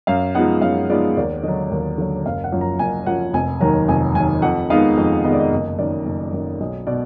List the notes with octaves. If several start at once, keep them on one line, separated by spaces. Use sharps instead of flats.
F#2 F5
F3 G#3 B3 D#4 F#5
F#2 F5
F3 G#3 B3 D#4 D5
D#2 D5
D3 F#3 D#5
D#2
D3 F#3
F#1 F5
F#5
F#2 F3
A#5
F#1 G#5
F#2 F3 F#5
F1 G#5
D#2 D#3 F#3 A#5
F1 G#5
D#2 D#3 F#3 G#5
F2 F#5
D#3 G#3 B3 D#4 F5
F2 D#5
D#3 G#3 B3 D#4 D#5
D5
D#5
F#1 D#5
F#2 D#3 D5
F#1
F#2 D#3
B1 D#5
B2 D5